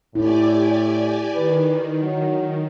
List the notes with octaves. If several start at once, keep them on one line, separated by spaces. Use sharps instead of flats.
A2 E4 G4 D5 G#5
D#3 B4
F#3